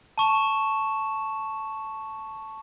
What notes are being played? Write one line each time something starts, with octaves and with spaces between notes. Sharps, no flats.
A5 C#6 E7